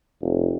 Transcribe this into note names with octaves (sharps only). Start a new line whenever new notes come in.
F1